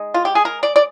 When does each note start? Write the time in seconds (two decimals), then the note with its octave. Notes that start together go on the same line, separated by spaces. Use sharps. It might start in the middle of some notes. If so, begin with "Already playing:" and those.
Already playing: G#3 D#4
0.14 F4
0.25 G4
0.35 G#4
0.45 A#4
0.63 D5
0.76 D5